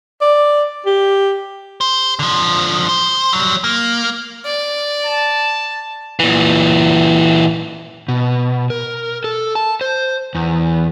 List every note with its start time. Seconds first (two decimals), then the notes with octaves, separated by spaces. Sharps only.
0.21 D5
0.86 G4
1.81 C5
2.19 D3 F3
2.89 C5
3.33 F#3 G3
3.64 A#3
4.45 D5
5.05 A5
6.20 A#2 E3
8.08 B2
8.70 A#4
9.24 A4
9.55 A5
9.81 C5
10.35 E2